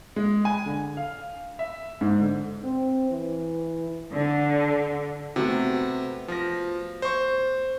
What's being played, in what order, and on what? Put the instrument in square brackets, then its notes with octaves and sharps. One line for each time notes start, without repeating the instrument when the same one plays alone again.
[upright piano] G#3
G#5
D3
F5
E5
G#2
D3
[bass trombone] C4
E3
[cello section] D3
[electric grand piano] C3 [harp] A3 B3 F#4
[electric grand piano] F3 A#6
C5 C#6